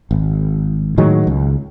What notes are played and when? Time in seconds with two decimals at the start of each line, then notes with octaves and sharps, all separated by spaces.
0.11 G#1
0.98 A2 D#3 F#3 G#3
1.27 C#2